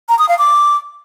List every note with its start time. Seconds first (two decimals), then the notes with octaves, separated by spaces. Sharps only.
0.09 A#5
0.19 D#6
0.29 F5
0.39 D6